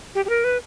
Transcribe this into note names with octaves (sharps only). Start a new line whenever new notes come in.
G4
G4
A#4
B4